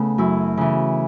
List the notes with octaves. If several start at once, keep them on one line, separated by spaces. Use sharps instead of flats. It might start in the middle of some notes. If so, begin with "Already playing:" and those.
Already playing: C#3 A3 B3
F#2 E4
C#3 E3